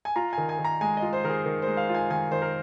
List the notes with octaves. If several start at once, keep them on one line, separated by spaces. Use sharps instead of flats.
G#5
F4 A#5
D#3 G#5
G#5
D#3
A#5
G#3 G#5
D#5
F4
C5
D#3 A#4
G#4
D#3
G#3 C5
F5
F4
G#5
D#3 G#5
D#3 C5
A#4